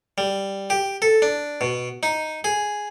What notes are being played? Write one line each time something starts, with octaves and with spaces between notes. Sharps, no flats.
G3
G4
A4
D4
B2
D#4
G#4